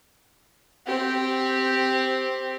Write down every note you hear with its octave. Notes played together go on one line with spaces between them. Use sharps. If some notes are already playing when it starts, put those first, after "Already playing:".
C4 G4